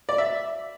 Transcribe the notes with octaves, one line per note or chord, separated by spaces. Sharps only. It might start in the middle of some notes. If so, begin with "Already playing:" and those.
D5
E5